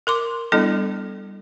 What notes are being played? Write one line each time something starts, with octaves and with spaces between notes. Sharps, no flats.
A#4 C6 D6
G3 B3 D4 E4 A4 D#5